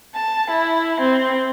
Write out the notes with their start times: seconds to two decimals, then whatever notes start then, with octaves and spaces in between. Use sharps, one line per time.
0.15 A5
0.50 E4
1.02 C4